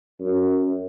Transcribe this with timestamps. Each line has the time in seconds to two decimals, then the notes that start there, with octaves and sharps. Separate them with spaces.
0.20 F#2